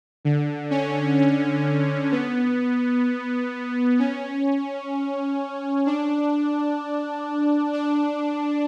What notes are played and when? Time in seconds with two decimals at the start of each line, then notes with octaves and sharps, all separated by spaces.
0.25 D3
0.71 C#4
1.18 C#4
2.12 B3
3.99 C#4
5.86 D4
7.73 D4